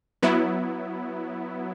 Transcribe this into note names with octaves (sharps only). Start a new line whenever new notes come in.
F#3 B3 E4